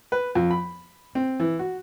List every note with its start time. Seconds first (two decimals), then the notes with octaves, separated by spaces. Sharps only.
0.12 B4
0.35 F2
0.51 B5
1.15 C4
1.40 E3
1.59 F#4